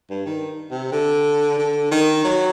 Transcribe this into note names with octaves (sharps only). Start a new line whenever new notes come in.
G2
D#3
C3
D3
D3
D#3
F#3